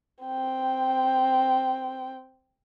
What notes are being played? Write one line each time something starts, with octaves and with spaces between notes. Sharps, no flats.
C4 G5